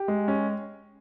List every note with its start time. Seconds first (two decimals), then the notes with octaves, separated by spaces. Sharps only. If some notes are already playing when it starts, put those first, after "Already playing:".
Already playing: G4
0.08 G#3
0.28 C#4